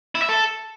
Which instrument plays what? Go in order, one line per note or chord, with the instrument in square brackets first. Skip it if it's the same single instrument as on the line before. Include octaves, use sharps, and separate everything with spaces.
[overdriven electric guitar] E4
E5
A4